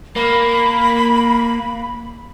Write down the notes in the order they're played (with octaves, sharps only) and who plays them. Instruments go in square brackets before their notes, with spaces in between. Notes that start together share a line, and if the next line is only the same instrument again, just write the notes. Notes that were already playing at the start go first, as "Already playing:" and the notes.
[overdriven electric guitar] A#3 [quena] B5